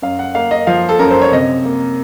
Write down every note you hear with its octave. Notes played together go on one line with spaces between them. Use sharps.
F#2 F5
F#5
A#3 F5
D#5
F3 F5
A4
F#2 A#4
C5
C#5
C3 D#5
A#3